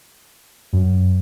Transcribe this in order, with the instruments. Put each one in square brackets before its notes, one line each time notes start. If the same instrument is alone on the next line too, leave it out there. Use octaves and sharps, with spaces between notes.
[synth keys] F#2